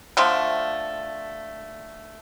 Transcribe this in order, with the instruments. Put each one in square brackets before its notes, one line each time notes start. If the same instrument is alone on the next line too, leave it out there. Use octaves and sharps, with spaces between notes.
[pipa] D3 F3 A3